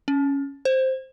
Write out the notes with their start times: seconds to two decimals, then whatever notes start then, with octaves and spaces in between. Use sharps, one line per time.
0.08 C#4
0.65 C5